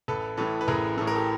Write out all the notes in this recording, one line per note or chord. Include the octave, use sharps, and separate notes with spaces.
A1 A4 B4
A2 E3 A4 B4
B4
A1 G#4 A#4
A2 E3 A4
A#4
G4 A4